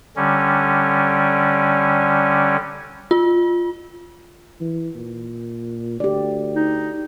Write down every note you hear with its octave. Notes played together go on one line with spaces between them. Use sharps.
D3 G3 C#4
F4
E3
A#2
D2 G4 D5
D#4